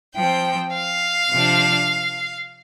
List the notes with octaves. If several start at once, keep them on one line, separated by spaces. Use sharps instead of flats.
F3 G5
C4
F5
C3 F3 D4